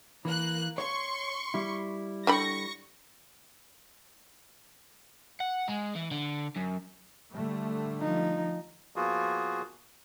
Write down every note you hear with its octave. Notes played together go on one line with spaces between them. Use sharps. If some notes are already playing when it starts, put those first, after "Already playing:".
E3 A#3 F#6
C#5 C6 C#6
G3 E4
D3 G4 B5 C#6 A#6
F#5
G#3
E3
D3
F#2
D3 G3 A3
F3 D#4
F3 A#3 B3 F4 F#4 G#4